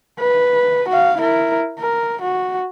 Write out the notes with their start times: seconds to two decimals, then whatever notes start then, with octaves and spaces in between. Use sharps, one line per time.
0.20 B4
0.88 F#4 F5
1.18 E4 A#4
1.79 A#4
2.21 F#4